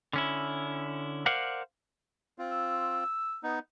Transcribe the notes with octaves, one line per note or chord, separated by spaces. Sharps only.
D3 C#4 E4
A#4 C5 D5 F5 F#5
C4 F4
E6
B3 D#4